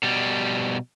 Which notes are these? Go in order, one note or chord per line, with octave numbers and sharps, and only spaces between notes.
B2 G3